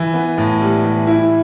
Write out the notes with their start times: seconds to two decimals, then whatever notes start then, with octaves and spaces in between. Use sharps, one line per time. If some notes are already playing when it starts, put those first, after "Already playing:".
Already playing: E3
0.14 B3
0.38 A2
0.61 G3
0.84 E3
1.07 E4